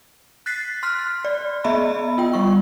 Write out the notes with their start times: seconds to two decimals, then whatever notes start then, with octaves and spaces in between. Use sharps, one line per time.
0.46 F#6 A6 B6 C7
0.83 C6 F6 F#6
1.25 D5
1.64 B3 D#5 E5 B5
2.18 F4 G5
2.33 G3 F4 C#6